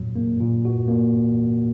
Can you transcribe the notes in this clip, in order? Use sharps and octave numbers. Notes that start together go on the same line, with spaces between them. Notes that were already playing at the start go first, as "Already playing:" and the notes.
Already playing: A#2 F#3
A#3
A#2
F#4
A#3